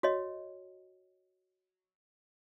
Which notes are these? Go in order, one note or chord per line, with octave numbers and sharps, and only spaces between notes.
F#4 C#5 D#5